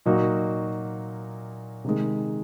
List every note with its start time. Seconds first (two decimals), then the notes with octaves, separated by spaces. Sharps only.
0.05 A#2 F#3 A#3 D#4 F#4
1.84 C3 D#3 G#3